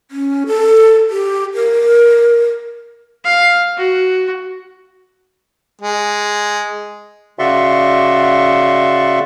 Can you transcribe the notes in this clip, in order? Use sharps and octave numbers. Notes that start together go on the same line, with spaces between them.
C#4
A4
G4
A#4
F5
F#4
G#3
C#3 F#4 D5 E5 C6 C#6